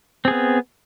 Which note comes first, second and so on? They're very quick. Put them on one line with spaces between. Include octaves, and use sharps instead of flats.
C4 G#4 B3